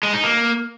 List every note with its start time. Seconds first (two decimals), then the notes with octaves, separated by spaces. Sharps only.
0.03 G#3
0.13 D#4
0.24 A#3